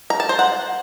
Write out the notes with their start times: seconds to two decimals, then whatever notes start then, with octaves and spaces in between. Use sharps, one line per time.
0.10 A#5
0.20 A5
0.29 C5
0.39 F#5